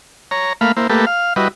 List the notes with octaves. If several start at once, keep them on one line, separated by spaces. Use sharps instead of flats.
C#5 A#5
A3 A#3 F5 B5
A#3 E4 C5
A3 A#3 G4 A4 B4
F5
G3 E4 F#4 B4 D#5